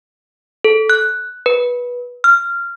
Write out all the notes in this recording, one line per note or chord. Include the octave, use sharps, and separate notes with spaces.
A4
F#6
B4
F6